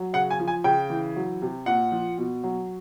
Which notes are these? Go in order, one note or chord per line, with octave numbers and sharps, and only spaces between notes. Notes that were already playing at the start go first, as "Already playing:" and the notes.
Already playing: F#3
C#3 F#5
G#5
F3
G#5
C#3 G5
E3
F#3
C3
A#2 F#5
F3
B2
F#3